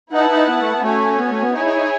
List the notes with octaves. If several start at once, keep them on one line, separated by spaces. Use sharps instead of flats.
D#4 E4 B4 F#5 A5
D#4
B3
A3
B3
A3 C#4 F#4 C#5 G#5
B3
A3
B3
D#4 E4 G#4 C#5 G#5
D#4
D#4